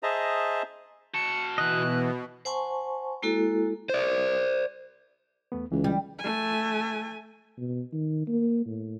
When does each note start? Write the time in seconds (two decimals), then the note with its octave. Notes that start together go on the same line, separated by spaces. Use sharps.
0.03 G#4 C5 D#5 E5 A5 A#5
1.14 F#4 A5 C#7
1.58 B2 E3 D#5 F#6
2.45 C5 F#5 G#5 A5 C6 C#6
3.23 G#3 A#3 E4 F#4 A4
3.89 C5 D5
5.52 E2 A3 B3
5.72 C#2 E3
5.84 G3
6.19 A3 G#5
7.58 B2
7.93 D#3
8.27 A#3
8.66 A2